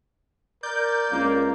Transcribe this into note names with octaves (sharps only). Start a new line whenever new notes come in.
A#4 D5 G6
C#2 A#3